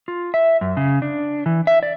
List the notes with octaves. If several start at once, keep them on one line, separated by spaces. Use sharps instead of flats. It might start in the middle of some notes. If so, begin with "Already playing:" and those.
F4
E5
F#2
C#3
D4
E3
E5
D5